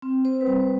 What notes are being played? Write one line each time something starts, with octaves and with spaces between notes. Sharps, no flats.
C4
C5
B4
G3 C5